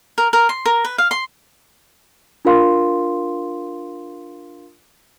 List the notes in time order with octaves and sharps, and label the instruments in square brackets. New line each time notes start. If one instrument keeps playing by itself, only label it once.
[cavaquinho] A#4
A#4
C6
A#4
B4
F5
C6
[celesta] D4 F4 A#4 F5 C6